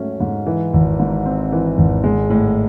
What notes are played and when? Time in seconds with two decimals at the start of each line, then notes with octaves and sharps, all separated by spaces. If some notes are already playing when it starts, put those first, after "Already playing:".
Already playing: G#2 F#3 A3 C#4
0.20 G#2
0.46 E3
0.74 G#1
1.00 G#2
1.26 C4
1.52 E3
1.78 G#1
2.04 G#3
2.30 A2